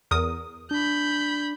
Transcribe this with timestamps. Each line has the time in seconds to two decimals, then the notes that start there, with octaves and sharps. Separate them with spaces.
0.11 E2 A#4 D#6
0.71 D4 B5 G6